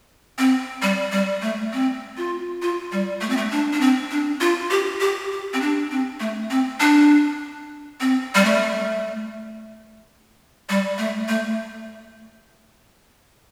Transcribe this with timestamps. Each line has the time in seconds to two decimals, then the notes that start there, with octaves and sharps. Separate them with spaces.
0.38 C4
0.82 G3
1.12 G3
1.42 A3
1.73 C4
2.17 F4
2.62 F4
2.92 G3
3.21 A3
3.30 C4
3.37 A3
3.51 D4
3.73 D4
3.81 C4
4.11 D4
4.41 F4
4.70 G4
5.00 G4
5.31 G4
5.53 C4
5.61 D4
5.91 C4
6.20 A3
6.50 C4
6.80 D4
8.00 C4
8.35 G3
8.45 A3
10.69 G3
10.98 A3
11.28 A3